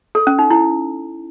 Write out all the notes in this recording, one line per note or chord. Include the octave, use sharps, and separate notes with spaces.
A4
C#4
D#4
E4